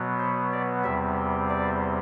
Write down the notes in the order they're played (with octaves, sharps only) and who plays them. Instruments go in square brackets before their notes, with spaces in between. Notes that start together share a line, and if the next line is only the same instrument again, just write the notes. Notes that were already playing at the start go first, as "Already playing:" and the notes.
Already playing: [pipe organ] B2 F#3 B3
C5
D5
E2 C3 G3 C4 E5
D5